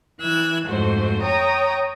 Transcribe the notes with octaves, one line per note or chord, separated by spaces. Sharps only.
E3 E6 F#6 G#6
F2 G#2 A3 F#4 C5
C#5 G5 A#5 D#6